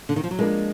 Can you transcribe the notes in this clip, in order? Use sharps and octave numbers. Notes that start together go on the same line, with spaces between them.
D3
D#3
F3
F#3
F3 G#3 A#3 D4